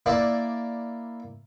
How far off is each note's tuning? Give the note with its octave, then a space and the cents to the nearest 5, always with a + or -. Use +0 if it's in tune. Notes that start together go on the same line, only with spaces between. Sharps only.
A#3 +0 E4 +0 D5 +0